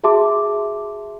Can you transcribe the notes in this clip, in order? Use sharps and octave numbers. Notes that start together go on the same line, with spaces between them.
F#4 G#4 E5 A5 C6 D6